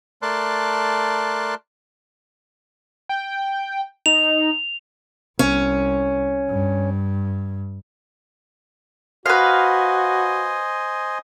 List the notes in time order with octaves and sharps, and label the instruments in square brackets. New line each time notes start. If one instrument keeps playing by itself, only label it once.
[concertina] A3 A#4 D5 A5 C6 F#6
[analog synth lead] G5
[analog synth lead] D#4 [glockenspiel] F7
[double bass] C2 [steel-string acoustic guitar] C#4
[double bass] G2
[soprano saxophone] F#4 [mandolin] B4 F5 [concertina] C5 D#5 G#5